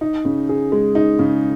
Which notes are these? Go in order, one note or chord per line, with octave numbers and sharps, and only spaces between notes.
D#4
C#3
G#4
G#3
D#4
C#3